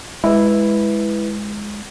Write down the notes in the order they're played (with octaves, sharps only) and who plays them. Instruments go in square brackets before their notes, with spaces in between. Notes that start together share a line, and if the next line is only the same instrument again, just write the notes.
[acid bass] G#3 [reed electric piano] E4 B4